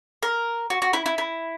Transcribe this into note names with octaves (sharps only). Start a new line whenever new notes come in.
A#4
F#4
F#4
E4
E4
E4